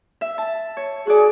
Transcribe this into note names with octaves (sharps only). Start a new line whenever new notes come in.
E5
A5
C#5
F#4 G#4 D5